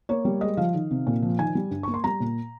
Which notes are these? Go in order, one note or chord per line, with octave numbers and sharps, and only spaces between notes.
A#3 C#5
G3
G#3 D#5
F3 F5
D#3
C3
A#2
F3
D#3 G#5
G3
G2
A#3 C#6
C6
G3 A#5
A#2